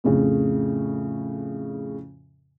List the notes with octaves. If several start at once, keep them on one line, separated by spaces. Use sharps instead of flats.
F2 A2 C#3